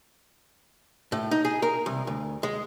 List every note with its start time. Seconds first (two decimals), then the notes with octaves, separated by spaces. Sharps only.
1.12 A2
1.31 D#4
1.45 G#4
1.62 A#4
1.86 C2
2.07 D2
2.43 G#3